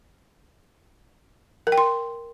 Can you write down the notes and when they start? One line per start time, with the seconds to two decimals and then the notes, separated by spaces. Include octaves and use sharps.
1.67 A#4
1.72 G5
1.78 C6